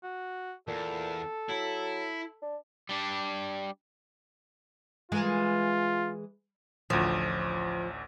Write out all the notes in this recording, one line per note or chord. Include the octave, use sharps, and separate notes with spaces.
F#4
E2 A#2 A4
F#3 E4
D4
G3 D4
E3 G#3 F4 A#4
A1 D2 F3